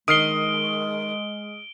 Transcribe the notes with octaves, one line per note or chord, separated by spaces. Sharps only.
D#3 G#3 D#6 F6 C7 D7 G7